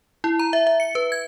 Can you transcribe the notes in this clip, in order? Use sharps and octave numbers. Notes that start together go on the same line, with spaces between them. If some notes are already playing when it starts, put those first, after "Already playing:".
E4
A#5
E5
E5
C#7
B4
G#6